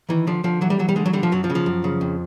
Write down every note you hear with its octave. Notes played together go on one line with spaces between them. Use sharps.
D#3 E3
D3 F3
D3 F3
E3 F#3
G3
E3 F#3
G3
D3 G#3
F#3
D3 G3
F3
F#2 F#3
F3
C#3
F3
F#2
C#3
F2